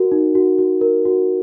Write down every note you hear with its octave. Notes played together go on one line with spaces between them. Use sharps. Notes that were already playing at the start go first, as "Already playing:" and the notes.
Already playing: F#4 A#4
D#4
F#4
F#4
A#4
F#4